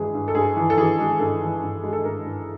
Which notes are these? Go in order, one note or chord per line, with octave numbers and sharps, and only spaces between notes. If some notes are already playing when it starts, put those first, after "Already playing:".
Already playing: G2 E3 G#3 G#4
G2
A4
G2 G#4
E3
A4
E3 G#4
G#3
G2 A4
E3
G2
G#3
A4
G2 A#4
G2